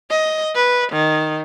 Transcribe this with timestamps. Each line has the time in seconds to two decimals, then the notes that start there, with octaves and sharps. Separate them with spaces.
0.10 D#5
0.55 B4
0.92 D#3